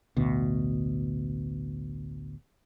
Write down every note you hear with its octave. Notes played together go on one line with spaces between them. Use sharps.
A1 D2 B2